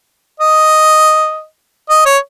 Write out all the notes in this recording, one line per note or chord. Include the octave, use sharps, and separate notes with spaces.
D#5
D#5
C#5